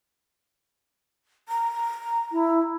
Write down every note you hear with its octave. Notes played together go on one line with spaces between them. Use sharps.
A#5
E4